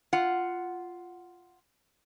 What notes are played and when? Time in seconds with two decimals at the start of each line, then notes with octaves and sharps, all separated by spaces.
0.13 F4 F#5